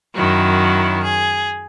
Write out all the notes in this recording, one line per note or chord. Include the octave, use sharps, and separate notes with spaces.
F#2 D#3 F#3 E4
G#4